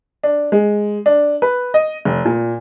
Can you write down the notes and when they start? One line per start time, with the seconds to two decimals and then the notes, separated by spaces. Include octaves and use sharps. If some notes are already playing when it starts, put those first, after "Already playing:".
0.23 D4
0.52 G#3
1.06 D4
1.42 B4
1.74 D#5
2.05 F1
2.25 A#2